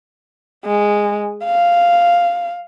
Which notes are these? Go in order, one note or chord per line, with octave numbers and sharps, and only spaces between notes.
G#3
F5